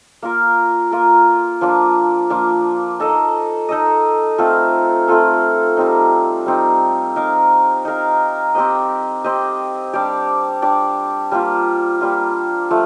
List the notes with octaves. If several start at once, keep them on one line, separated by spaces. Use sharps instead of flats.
A#3 F4 A#4
A#3 F4 A#4
F3 A#3 D4
F3 A#3 D4
D#4 A4 D#5
D#4 A4 D#5
A3 C4 F4 A4
A3 C4 F4 A4
G3 C4 D#4
G3 C4 D#4
D#4 A#4 F5
D#4 A#4 F5
C4 G4 C5 D#5
C4 G4 C5 D#5
G3 D4 G4 D5
G3 D4 G4 D5
G3 A#3 F4
G3 A#3 F4
F3 A3